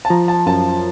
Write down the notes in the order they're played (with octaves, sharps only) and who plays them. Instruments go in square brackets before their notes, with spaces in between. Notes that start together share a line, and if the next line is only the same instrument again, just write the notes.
[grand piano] A5
[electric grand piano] F3 [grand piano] A#5
[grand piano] A5
[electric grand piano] F#2 [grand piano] A5